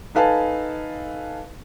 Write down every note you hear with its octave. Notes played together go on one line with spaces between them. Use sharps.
D#4 A4 B4 F5 G#5 A5